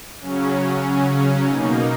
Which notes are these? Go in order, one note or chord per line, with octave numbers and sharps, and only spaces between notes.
C#3 F#3 C#4
B2 A#3 D#4